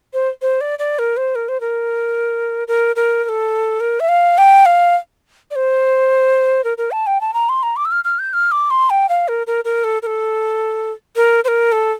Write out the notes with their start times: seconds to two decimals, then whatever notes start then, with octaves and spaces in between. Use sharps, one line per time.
0.13 C5
0.42 C5
0.61 D5
0.79 D5
0.99 A#4
1.17 C5
1.35 A#4
1.48 C5
1.60 A#4
2.68 A#4
2.96 A#4
3.24 A#4
3.29 A4
3.80 A#4
4.00 E5
4.09 F5
4.38 G5
4.66 F5
5.51 D5
5.56 C5
6.64 A#4
6.78 A#4
6.91 A5
7.07 G5
7.21 A5
7.34 A#5
7.49 C6
7.63 A#5
7.76 D6
7.85 E6
7.91 F6
8.04 F6
8.19 G6
8.33 F6
8.52 D6
8.70 C6
8.90 G5
9.09 F5
9.28 A#4
9.47 A#4
9.65 A#4
9.84 A4
10.02 A#4
10.06 A4
11.16 A#4
11.44 C5
11.48 A#4
11.72 A4